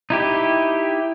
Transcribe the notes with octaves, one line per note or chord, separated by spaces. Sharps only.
D#4 E4 G4